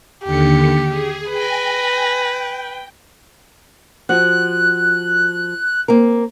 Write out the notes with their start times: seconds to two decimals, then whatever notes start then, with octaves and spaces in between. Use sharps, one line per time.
0.24 D#2 D3 G4 C#7
0.89 G#4
1.30 B4 G5 G#5 A#6
2.15 G5
4.09 F3 F#4 F#6
5.88 A#3 C4 A#4